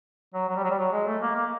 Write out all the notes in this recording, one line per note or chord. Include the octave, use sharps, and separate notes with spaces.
F#3
F#3
G3
F#3
G3
F#3
G#3
A3
A#3
A#3